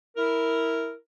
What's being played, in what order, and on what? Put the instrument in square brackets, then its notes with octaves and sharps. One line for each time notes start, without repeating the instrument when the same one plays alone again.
[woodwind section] E4 A#4